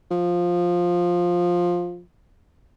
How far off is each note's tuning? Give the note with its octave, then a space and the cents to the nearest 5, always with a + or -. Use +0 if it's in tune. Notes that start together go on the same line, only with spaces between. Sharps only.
F3 +10